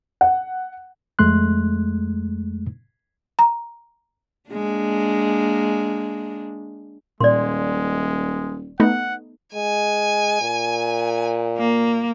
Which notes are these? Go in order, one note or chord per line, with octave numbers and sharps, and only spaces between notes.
F#5
F2 G#3 A3 C6 F#6
A#5
G#3 A#3 D4
D#1 A#2 G#3 D5 C6
A3 B3 D#4 F#5
G#3 G#5
A#2
A#3